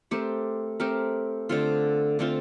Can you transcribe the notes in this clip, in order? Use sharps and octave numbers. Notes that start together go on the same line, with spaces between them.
A3 C4 G4 A#4
A3 C4 G4 A#4
D3 A3 C4 F4
D3 A3 C4 F4